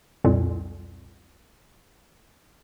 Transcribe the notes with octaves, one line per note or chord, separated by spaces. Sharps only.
C2 F2 A#2